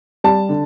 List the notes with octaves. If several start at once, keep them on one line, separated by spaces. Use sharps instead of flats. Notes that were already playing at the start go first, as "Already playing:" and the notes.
G3 A5
D3